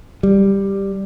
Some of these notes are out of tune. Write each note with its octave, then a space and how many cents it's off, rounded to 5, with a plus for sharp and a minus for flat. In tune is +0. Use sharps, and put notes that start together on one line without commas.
G3 +5